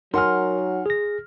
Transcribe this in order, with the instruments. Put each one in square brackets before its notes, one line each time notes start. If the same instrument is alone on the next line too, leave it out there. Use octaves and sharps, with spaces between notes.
[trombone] F#3 [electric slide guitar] D#4 F#5 G#5 [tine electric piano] A#4 [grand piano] C6 F6
[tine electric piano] G#4 A#6